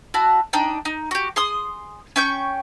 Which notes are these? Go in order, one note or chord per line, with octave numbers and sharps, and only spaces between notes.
E4 F#4 A5
D4 D#4 G5
D#4
F#4 G4
G#4 C6 D#6
C#4 G5 C#6 G6